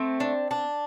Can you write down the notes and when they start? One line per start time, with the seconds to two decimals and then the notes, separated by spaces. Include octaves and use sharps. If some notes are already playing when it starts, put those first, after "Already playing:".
Already playing: A3 C4
0.20 D4
0.51 D4